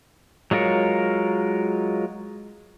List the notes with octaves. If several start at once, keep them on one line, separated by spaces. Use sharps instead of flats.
F#3 G#3 F4 A#4 C#5